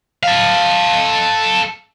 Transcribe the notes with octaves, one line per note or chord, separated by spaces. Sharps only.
A4 F5